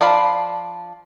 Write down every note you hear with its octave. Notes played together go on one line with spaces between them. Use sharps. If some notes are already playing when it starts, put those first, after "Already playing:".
F3 D4 F5 B5